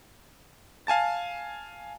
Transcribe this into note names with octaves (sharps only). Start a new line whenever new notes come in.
F5 G#5 A5 A6